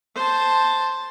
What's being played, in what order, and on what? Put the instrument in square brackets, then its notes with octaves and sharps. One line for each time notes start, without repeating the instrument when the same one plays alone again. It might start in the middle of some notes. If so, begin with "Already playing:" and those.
[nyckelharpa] C5 A5